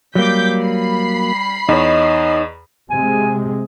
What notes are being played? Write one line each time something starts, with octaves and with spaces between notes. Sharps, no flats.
F#3 G3 A#3 D6 G6 B6
B5 C7
E2 D#4 C#5 D#5
C3 G#3 G#5